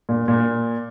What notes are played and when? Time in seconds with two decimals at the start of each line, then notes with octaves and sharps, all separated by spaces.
0.09 A#2
0.28 A#2